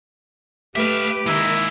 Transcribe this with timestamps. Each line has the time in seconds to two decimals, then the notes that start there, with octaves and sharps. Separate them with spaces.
0.76 A3 G4 B4 E5 F5
1.27 D#3 G#3 A#3 E4